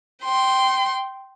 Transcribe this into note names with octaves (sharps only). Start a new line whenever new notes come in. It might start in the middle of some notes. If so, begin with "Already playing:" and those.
G5 C6